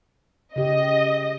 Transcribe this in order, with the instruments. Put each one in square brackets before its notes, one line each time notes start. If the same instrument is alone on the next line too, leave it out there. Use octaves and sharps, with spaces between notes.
[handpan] C#3 G4 [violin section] D#5